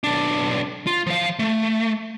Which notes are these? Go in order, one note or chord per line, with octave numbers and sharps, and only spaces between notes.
B1 D4
F4
F3 F5
A3